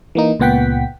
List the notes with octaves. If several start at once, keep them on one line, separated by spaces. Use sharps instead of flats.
E3 A#3 D#4
C#2 A#2 B3 F#5 G5 B6